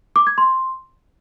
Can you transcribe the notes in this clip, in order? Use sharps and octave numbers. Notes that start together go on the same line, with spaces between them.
D6
G#6
C6